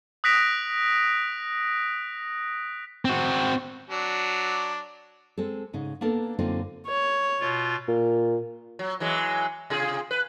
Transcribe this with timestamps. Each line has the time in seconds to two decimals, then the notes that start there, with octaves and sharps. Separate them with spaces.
0.24 D#6 F#6 A#6 B6 D7 F7
3.05 C4 F#4
3.89 F#3 D4
5.38 G#3 C4 A4
5.73 G#2 C#3 D#4
6.01 A#3 B3 D4 A4 A#4
6.39 F#2 D3 A#3 C4 D#4 F4
6.86 C#5
7.40 B2 F4
7.88 A#2
8.79 F#3
9.00 E3 F#3 G#3
9.70 C3 F4 G#4
10.11 B4